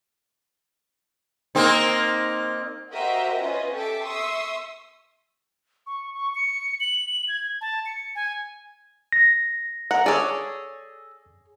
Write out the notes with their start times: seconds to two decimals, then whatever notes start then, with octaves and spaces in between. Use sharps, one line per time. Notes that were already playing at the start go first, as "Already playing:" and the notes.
1.55 A#3 C4 D#4
2.93 F#4 G4 A#4 C5 D#5 E5
3.42 C#4 F4 B4 D#5
3.74 G4 A4 E5 A5 D6
4.04 E5 C6 C#6 D#6 E6
5.87 C#6
6.15 C#6
6.35 C#7
6.80 F#7
7.29 G#6
7.61 A5
7.86 C#7
8.15 G#5
9.12 A#6
9.91 A#4 F#5
10.06 G#4 A4 C#5 D5